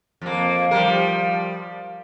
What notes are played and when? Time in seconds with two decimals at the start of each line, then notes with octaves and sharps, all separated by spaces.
0.21 F2 A#3
0.71 F3 G3 A#4